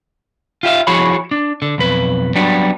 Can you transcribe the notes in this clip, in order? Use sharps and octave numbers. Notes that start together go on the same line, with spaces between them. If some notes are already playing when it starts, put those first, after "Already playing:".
F4 G4 E5 F5
F3 E4 F#4 G#4 C#5 B5
D4
D3
B1 F2 B4
F#3 G3 B3 D4 F#4